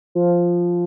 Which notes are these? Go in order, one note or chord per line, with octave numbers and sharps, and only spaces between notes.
F3